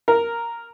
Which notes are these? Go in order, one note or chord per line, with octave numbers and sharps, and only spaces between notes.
A#4